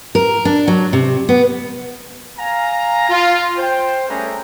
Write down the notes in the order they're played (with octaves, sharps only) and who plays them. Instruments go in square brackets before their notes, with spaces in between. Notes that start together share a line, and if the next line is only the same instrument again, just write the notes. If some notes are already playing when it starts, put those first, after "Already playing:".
[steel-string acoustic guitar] A#4
D4
F#3
C3
B3
[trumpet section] F5 G#5 A#5
F4
C5 G5
G3 A3 C#4 G#4 B4 A#5